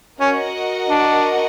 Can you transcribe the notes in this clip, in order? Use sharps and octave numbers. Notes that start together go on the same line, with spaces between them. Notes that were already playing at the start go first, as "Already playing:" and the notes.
C#4 F#4 A#4 D#5 F#5
D4